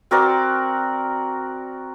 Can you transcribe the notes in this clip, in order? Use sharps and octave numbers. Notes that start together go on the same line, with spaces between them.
C4 F#4 A#4 D5